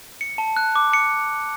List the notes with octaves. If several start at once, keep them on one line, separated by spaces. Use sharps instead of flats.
C#7
A5
F#6
D6
C#7